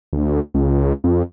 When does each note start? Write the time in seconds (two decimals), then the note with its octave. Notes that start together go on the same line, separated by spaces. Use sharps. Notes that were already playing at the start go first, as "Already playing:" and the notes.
0.13 D2
0.54 C#2
1.04 F2